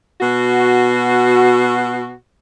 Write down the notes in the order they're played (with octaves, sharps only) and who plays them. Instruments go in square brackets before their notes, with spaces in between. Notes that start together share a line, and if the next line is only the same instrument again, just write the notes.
[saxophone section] B2 F#4